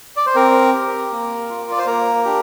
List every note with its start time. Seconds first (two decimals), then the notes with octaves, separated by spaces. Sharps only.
0.16 D5
0.26 C5
0.35 C4 A#4
0.74 G4
1.11 A#3
1.49 F4
1.71 D5
1.78 C5
1.86 A#3 A#4
2.25 D4 G4